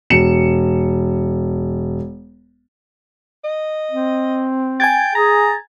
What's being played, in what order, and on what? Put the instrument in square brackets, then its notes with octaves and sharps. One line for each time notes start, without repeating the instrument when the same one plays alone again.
[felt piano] E1 C#7 E7
[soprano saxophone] D#5
[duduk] C4
[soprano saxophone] G5 [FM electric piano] G#5 G#6 A6
[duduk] G#4 [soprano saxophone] A#5